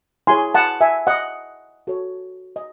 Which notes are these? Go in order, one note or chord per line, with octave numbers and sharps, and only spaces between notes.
E4 G#4 C#5 G#5 C6
F#5 A5
E5 G#5
D#5 F#5
F#4 A4 C#5
D#5